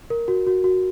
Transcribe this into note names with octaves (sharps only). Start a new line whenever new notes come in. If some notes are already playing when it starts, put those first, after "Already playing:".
A#4
F#4
F#4
F#4